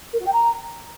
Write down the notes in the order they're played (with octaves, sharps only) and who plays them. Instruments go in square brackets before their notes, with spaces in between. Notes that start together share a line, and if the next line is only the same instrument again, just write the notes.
[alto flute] A#4
F#4
G5
A#5